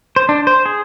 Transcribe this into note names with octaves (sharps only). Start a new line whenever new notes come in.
C5
D4
C5
G#4